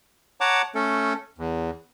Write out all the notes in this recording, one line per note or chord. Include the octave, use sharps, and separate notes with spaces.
C#5 F#5 A5 A#5 D6
A3 C#4 A4
E2